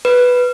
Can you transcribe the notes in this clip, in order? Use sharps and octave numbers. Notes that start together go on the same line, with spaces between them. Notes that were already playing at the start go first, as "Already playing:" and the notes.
B4